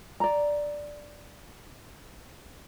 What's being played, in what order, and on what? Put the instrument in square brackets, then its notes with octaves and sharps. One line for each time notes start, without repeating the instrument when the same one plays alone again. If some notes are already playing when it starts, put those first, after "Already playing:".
[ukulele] D5 A#5